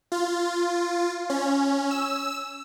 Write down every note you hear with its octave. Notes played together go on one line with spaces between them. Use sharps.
F4
C#4
E6